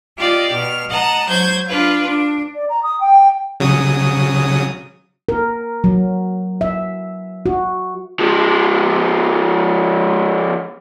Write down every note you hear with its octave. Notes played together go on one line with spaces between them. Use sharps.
F4 G4 D5 D#5
B2 F6
D#5 F#5 A5 A#5
F#3 C5 G6 G#6
D4 F4 B4 F5
D4
D5
A#5
D#6
G5
C#3 F#3 D#6
A#4
F#3
E5
F#4
F3 G#3